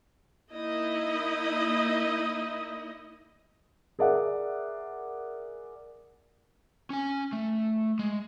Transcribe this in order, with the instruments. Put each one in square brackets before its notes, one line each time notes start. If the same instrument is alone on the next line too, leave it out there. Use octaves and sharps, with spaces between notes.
[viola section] A#3 D#4 E4 D#5
[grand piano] G#4 A#4 D5 E5 F#5
[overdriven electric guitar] C#4 G#5
A3
G#3